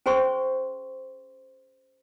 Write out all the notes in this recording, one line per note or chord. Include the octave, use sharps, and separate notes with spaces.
C#4 G#4 C5 C6 C#6